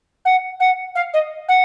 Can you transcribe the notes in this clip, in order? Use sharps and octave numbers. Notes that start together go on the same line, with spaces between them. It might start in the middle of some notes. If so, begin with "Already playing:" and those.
F#5
F#5
F5
D#5
F#5